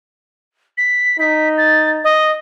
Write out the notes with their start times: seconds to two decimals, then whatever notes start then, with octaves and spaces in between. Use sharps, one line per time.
0.77 B6
1.20 D#4 B6
1.58 A6
2.04 D#5